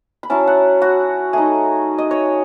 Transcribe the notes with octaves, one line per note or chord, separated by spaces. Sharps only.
B5
F#3 C#4 E4 A5
F#5
F#4
A3 D#4 G#4
D#5
C#5